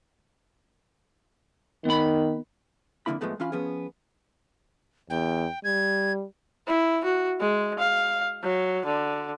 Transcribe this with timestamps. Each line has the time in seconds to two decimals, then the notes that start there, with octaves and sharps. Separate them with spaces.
1.85 D#3 B3 B5
3.06 F2 B2 D3 A#3 E4 B5
3.21 A2 F3 G#3 A3 B3
3.40 E3 C#4 F4 F5 B5
3.52 F3 B3 C#4 G#4
5.10 E2 G5
5.64 G3 G#6
6.68 E4
7.05 F#4
7.40 G#3
7.79 F5
8.43 F#3
8.86 D3